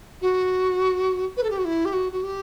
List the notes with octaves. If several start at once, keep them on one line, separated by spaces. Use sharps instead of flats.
F#4
B4
A4
G4
F#4
E4
G4
F#4
F#4
G4